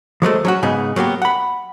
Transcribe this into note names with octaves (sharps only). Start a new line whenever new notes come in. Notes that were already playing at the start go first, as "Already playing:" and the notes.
F3 F#3 G#3 A3
F#3 C#4 F#4
G#2 C#3 B3 D#4 G#4
F#3 A#3 B3 G4
F#5 B5